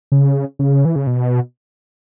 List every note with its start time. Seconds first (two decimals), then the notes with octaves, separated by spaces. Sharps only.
0.12 C#3
0.59 C#3
0.85 E3
0.96 C#3
1.07 B2